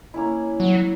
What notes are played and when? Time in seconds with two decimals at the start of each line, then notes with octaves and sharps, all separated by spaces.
0.14 A#3 C#4 E4
0.60 F#3